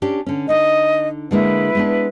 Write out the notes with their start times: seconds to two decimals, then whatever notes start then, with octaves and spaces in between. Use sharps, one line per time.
0.02 C#4 D4 G4
0.26 D3 C#4
0.49 D3 D#4 D#5
1.31 D3 G#3 A#3 E4 B4
1.75 G#3 B3 D4